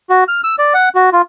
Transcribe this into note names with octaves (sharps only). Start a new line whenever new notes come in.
F#4
F6
E6
D5
F#5
F#4
F4